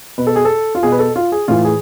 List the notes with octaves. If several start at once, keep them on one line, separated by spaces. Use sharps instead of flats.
B2 B4
A4
G#4
A4
F4
B2 G#4
B4
A4
F4
G#4
A2 E3 F4
G#4